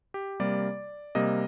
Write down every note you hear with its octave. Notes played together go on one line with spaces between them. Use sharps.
G4
C3 G3 A#3 D5
C3 G3 A#3 D#5